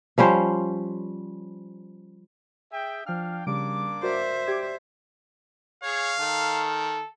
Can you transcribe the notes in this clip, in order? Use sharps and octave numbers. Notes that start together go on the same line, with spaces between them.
F3 G3 C#4 C5
G#4 E5 G5
F3 D4 F5 G5 F6
C#3 G3 A#3 D4 D6 D7
F#4 A#4 C5 D5 E5
G4 D5 D6 G#6
G#4 C#5 F5
D#3 A4